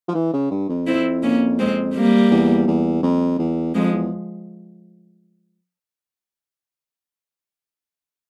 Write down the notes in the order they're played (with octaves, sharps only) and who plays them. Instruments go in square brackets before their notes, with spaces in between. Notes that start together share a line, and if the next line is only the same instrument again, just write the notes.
[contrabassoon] F3
E3
C#3
G2
F2
[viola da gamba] C4 E4
A#3 C#4
G#3 C4
G3 A#3
[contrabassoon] E2
E2
F2
E2
[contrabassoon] F2 [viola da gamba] F3 G#3
[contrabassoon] E2